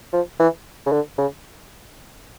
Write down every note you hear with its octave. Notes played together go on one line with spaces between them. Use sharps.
F3
E3
C#3
D3
C#3